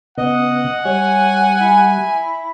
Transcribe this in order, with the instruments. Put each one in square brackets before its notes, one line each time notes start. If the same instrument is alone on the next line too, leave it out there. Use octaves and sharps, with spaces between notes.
[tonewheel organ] C#3 B3 [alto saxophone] D#5 [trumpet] F#5
[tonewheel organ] G3 [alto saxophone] C#5 [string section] G#5
[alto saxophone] E4